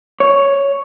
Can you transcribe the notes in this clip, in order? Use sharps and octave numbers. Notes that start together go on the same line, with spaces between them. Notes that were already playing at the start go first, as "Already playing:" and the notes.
C#5